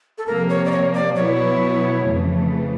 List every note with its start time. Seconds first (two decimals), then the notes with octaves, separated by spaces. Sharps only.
0.18 A4
0.27 C3 F3 A#3 A#4
0.49 C#5
0.66 D5
0.72 C#5
0.94 D5
1.16 B2 F#3 B3 E4 C#5
2.04 F2 C#3 E3 A3